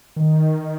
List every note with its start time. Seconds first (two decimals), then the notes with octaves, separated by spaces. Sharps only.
0.16 D#3